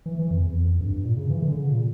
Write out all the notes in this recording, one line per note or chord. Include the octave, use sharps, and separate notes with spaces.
E3
E3
F2
E2
F2
G2
A#2
C#3
E3
D3
C#3
A#2